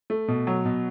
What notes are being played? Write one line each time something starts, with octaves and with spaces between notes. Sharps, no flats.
A3
B2
F#3
B2